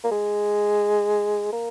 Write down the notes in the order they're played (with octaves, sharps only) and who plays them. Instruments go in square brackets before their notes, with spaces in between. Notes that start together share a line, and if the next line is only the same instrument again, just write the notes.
[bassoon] A#3
G#3
A#3